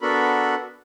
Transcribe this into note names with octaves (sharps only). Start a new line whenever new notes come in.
B3 D4 F#4 A4 A#4 B5